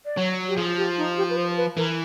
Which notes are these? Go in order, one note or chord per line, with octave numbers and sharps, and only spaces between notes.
D5
F#3 C#5
G4
F3 G#4
G4
D#4
G4
B4
C5
B4
E3 A#4